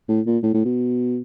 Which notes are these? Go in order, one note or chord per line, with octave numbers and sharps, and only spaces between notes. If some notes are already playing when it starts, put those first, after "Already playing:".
A2
A#2
A2
A2
B2